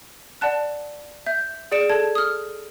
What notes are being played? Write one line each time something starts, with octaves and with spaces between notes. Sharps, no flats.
D5 F#5 A5 F#6
E5 G6
G#4 D5 C#7 D7 E7
A4 A5 G#6
D#6 F6